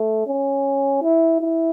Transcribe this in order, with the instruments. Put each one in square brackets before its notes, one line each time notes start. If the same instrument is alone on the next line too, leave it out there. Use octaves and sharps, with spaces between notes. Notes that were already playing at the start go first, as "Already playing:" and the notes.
Already playing: [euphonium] A3
C#4
E4
E4